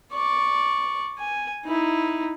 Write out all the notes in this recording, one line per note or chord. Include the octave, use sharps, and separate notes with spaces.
D5 C#6
G#5
D#4 E4